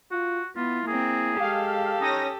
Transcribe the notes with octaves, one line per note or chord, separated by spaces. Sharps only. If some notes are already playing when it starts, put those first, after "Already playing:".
F4 F#4
B3 E4 F4
A#3 C4 G#4
G#3 G4 A4 F5
C#4 D#4 D#6 A#6